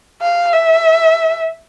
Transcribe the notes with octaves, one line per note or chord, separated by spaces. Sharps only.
F5
E5